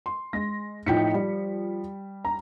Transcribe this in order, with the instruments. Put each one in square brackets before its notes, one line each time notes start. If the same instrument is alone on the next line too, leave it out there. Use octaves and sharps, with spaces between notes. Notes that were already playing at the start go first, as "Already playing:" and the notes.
[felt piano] C6
[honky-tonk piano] G#3 A#6
[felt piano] A2 D#4 G5 [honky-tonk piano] F3 B6 C#7
[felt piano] G3
[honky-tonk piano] A#5